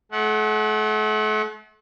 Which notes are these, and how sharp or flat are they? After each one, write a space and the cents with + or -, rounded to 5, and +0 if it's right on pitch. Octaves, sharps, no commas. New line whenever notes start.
A3 -40 F#5 +0